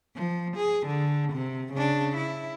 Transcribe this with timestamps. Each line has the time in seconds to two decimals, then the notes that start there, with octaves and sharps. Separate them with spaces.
0.16 F3
0.57 G#4
0.86 D3
1.32 C3
1.73 C#3 D4
2.17 E4